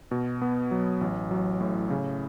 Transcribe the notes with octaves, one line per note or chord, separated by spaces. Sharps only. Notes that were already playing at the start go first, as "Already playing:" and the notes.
B2
B3
F#3
A1
F#3
A2
C#3